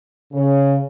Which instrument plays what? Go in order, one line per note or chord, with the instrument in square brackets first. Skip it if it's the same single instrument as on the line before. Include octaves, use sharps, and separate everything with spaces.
[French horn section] C#3